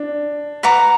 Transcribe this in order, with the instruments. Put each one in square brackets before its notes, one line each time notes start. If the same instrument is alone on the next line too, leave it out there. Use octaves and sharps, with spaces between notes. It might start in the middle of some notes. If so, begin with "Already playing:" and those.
Already playing: [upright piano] D4
[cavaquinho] B4 F#5 A#5 D6